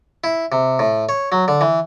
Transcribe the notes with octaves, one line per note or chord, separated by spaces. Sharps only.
E4
C3
A2
C#5
F#3
D3
E3